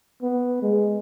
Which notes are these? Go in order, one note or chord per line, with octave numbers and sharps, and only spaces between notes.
B3
G#3